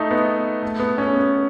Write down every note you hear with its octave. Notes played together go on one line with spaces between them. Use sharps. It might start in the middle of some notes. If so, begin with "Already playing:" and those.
Already playing: A3 D#4
B3
A3
B3
C#4
B3